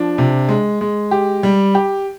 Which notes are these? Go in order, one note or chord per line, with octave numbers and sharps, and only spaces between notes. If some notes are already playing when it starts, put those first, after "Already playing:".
Already playing: F3 D4
C3
G#3
G#3
G4
G3
G4